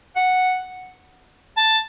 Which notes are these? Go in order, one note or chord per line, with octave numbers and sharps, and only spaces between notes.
F#5
A5